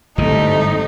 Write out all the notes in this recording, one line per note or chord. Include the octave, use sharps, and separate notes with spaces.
G1 G#2 E3 G3 A3 C4 D#4